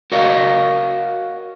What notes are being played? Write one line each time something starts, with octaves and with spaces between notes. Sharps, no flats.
F#4 A#4 C#5 D#5 F5